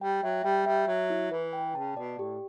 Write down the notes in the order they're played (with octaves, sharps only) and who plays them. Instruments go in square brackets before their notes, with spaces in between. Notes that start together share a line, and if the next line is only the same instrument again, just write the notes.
[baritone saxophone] G3 [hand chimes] G5
[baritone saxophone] F#3 [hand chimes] E5
[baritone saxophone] G3 [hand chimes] G5
[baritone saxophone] G3 [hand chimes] E5
[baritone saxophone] F#3 [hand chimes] E5
[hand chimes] E4
[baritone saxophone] E3 [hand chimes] B4
[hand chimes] G5
[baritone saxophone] C#3 [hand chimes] A5
[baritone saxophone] B2 [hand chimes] D5
[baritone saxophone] A2 [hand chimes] G4